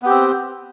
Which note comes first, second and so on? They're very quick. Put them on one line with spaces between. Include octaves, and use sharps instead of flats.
B3 G4 C4